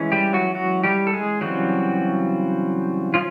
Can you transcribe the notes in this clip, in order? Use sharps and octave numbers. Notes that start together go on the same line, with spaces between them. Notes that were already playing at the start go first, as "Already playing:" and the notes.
Already playing: E3 G#3 C#4
G3 G4
F#3 F#4
F#3 F#4
G3 G4
A4
G#3 G#4
C#3 E3 F#3 G3 C4 F#4
F3 C#4 F4